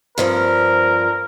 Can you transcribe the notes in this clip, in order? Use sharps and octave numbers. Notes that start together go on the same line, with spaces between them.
G2 F3 C4 A#4